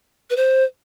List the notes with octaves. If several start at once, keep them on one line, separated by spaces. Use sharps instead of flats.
B4
C5